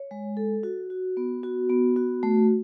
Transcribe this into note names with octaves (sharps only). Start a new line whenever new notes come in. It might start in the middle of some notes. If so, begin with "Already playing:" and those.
Already playing: C#5
G#3
A4
F#4
F#4
B3
F#4
B3
F#4
A3